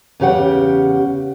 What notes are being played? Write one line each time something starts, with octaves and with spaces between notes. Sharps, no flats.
E2 C#3 G4 F#5